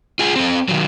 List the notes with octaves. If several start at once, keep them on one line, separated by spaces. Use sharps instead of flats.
F4 G#4
C4 A4
D#3 F#3